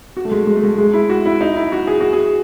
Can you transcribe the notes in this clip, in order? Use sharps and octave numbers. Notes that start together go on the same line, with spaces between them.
F#4
A3
G#3
G#3
A3
G#3
G#3
E4
F#4
E4
D#4
E4
F#4
G#4
F#4
G#4